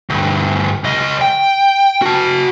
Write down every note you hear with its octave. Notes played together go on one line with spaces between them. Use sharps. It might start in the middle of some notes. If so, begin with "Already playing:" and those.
D2 G2
C#2 D#5
G5
F#4 A5